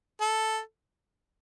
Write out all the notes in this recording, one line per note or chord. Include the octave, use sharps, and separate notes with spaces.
A4